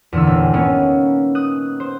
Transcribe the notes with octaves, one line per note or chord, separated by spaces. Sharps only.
E2 A#2 D3 E6
G1
D#3 G#3 A#3 B3 C#4
D#6 F#6
C5